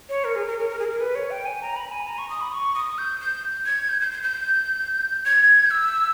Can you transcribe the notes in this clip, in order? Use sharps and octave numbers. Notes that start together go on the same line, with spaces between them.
C#5
A#4
G#4
A#4
A#4
A#4
G#4
A#4
B4
C#5
G5
G#5
A#5
B5
G#5
A#5
C#6
D#6
B5
C#6
D#6
G6
G6
G#6
G6
G6
G6
G6
G#6
G6
E6